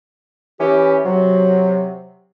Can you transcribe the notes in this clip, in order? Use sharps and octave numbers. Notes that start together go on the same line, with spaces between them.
E3 C#4 G4
C3 F#3